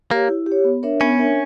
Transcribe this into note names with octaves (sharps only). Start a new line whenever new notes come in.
A#3 G4 C#5
E4
G4
C#5
B3
D4 A#4 C#5 E5
B3 C#4
D4 A#4 C#5 E5